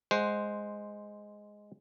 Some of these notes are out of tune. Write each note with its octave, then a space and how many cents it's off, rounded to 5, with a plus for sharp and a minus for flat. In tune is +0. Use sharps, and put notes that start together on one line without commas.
G#3 +0 C5 +0 F#5 +0